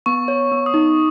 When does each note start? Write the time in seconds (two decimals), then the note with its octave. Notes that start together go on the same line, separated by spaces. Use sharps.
0.06 B3 C#6
0.28 C#5
0.51 B3
0.66 D#6
0.74 D#4